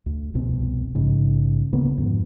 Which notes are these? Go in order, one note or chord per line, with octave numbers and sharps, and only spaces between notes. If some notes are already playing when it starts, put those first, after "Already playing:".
D2
F1 C2 B2 C4
A#1 G#2 C#3
D2 C#3 A#3 B3
F2 G#2